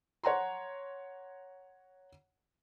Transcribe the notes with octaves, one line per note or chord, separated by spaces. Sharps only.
C#5 F#5 A#5 C6